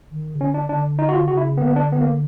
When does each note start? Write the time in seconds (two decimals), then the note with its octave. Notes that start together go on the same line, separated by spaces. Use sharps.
0.11 D#3
0.35 C#3
0.40 D3 C#4
0.54 D4
0.69 D3 D4
0.99 D#4
1.09 F#4
1.13 F4
1.28 C#3 F#4
1.37 E4
1.57 D3 B3
1.62 A#3
1.67 B3
1.76 D4
1.92 B3
2.01 A#3